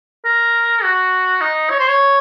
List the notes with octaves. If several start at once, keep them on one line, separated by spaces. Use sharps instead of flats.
A#4
F#4
D#4
C#5
C5
C#5